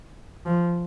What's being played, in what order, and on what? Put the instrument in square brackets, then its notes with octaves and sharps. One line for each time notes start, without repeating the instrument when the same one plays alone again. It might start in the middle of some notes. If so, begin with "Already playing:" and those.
[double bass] F3